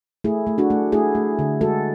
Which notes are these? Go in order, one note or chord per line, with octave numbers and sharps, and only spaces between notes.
A3 E4 G#4
A3
D4 F#4
A3
A3 E4 G#4
A3
D3
G#3 F#4 A4